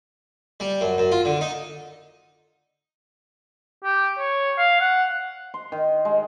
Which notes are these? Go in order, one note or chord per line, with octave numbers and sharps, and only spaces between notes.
G3
F#2
F#2
F4
D3
D#4
G4
C#5
F5
F#5
C6
D#3
G#3